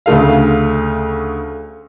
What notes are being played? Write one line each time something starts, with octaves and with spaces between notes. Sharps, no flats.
D2 C#3 A3 F5